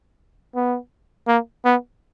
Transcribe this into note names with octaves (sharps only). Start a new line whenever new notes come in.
B3
A#3
B3